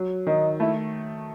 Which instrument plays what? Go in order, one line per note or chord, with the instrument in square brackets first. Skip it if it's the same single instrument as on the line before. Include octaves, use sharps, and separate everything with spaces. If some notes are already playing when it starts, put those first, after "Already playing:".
Already playing: [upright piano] F#3
[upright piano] D#3 [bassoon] D#4
[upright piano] A3 [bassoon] E4